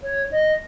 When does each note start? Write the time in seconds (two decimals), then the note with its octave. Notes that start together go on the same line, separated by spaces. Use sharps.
0.03 C#5
0.31 D#5